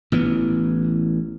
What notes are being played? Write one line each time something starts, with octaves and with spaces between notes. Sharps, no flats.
A1 E3 B3